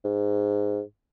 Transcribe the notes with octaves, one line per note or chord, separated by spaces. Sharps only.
G#2